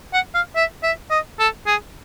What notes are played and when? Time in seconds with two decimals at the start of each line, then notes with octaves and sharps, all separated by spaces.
0.14 F#5
0.35 F5
0.56 E5
0.83 E5
1.11 D#5
1.39 A4
1.67 G#4